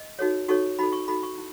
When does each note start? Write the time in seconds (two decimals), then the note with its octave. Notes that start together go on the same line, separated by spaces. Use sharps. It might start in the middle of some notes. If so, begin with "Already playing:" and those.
Already playing: D#5
0.19 D#4 F#4 A4 C#5
0.48 D#4 F#4 A4 C#5 C#6
0.79 D#4 F#4 A4 B5
0.92 C#6
1.08 D#4 F#4 A4 B5
1.23 C#6
1.38 E4